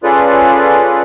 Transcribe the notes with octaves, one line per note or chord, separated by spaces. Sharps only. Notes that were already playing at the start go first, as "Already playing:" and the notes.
C#4 F4 G#4 A4 B4 D5